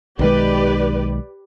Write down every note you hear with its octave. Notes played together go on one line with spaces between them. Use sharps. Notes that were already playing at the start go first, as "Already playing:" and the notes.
B1 D#3 G#3 G4 B4 D5